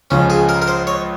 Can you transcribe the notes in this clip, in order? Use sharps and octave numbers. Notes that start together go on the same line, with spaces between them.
C#2 C#3 F3 C#4
G#4
A#4
A#4
C5
C#5